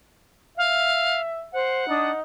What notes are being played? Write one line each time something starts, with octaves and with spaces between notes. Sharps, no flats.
E5 F5
C5 F#5
D4 D#4 D#6